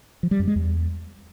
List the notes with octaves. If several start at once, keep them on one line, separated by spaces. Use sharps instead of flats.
F3
G3
F#2
G#3
E2